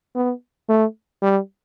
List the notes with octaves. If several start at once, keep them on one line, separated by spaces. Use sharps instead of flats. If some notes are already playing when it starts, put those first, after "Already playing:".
B3
A3
G3